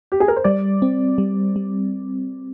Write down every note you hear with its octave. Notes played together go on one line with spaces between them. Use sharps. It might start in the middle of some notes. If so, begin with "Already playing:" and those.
G4
G#4
A#4
C5
G3 D5
C4
G3
G3